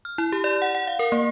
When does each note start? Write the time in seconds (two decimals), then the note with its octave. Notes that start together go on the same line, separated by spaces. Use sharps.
0.05 F6
0.18 E4
0.32 G4
0.44 D5
0.62 F#5
0.75 F#5
0.87 F5
0.99 A#4
1.12 A#3